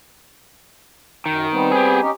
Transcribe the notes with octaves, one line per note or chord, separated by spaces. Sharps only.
F#2 D#3
G3 B3 C4
G4 G#4
C#4 D#4 G4